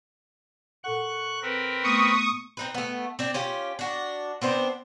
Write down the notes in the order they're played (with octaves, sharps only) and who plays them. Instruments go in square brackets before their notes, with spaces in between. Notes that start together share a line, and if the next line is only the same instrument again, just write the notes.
[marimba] A#2 A4 F#5 [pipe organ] C#6 F#6
[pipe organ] C4 A#4 B4
[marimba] A3 B3 [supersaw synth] C#6 D#6
[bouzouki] C4 D#4 B4
A3 B3
C4 D4
C#4 F4 G4
D4 F#4
B3 C4 D4 C5